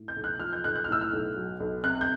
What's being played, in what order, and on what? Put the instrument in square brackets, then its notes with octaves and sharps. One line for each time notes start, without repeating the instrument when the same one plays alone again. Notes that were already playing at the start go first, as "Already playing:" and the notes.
Already playing: [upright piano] A2
G6
B1
F#6
F3 F6
G6
B1 F#6
F#6
F6
A2 E6
F6
B1
F#3
B1
C3 F#6
G6